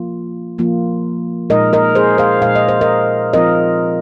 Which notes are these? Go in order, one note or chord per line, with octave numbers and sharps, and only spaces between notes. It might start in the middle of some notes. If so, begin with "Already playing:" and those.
Already playing: F3 A#3 F4
F3 A#3 F4
A#2 G#3 D#4 A#4 D#5
A#4 D#5
G#4 C5
C5 F5
A#2 G#3 D#4 F5
D#5
C5
A#4 D#5
F3 C4 F4 A#4 D#5